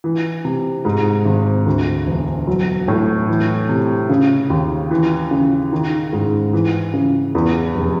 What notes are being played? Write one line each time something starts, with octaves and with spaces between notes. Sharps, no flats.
E3
C3
G#2
G#1
D2
E1
F#3
A2
E3
C3
C#3
D#2
E3
C#3
D#3
G#2
E3
C#3
E2
F1